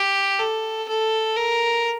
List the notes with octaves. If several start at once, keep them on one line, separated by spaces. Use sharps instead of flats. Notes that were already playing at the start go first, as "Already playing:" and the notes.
Already playing: G4
A4
A4
A#4